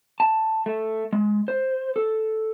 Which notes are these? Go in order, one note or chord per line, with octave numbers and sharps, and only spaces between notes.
A5
A3
G#3
C5
A4